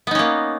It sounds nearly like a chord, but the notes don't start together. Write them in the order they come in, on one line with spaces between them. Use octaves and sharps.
B3 D#4 C#4 A#3